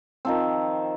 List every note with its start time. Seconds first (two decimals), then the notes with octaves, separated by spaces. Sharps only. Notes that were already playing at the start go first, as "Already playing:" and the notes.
0.25 D#3 F3 C4